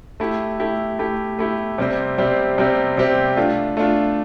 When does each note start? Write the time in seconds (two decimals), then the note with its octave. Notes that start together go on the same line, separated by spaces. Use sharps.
0.20 A3 E4 G4
0.60 A3 E4 G4
0.99 A3 E4 G4
1.39 A3 E4 G4
1.78 C3 G3 C4 G4 C5
2.18 C3 G3 C4 G4 C5
2.58 C3 G3 C4 G4 C5
2.97 C3 G3 C4 G4 C5
3.37 A3 D4 F4
3.77 A3 D4 F4